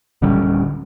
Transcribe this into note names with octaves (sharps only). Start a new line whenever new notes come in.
D1 D3 G3 C#4